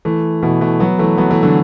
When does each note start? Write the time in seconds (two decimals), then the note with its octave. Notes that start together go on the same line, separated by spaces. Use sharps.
0.05 E3 A3
0.42 B2 E3
0.61 E3 A3
0.80 F#3 B3
0.99 E3 A3
1.18 F#3 B3
1.30 E3 A3
1.43 D3 F#3